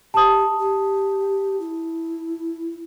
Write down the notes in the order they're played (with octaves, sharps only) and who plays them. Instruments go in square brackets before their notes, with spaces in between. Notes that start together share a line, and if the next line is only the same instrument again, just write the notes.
[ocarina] G4 [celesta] A5 D#6
[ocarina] G4
E4